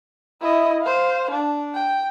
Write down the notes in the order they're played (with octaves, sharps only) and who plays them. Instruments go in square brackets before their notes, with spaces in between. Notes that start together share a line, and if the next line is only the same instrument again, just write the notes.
[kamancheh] E4 D#5
C5 F5
D4
G5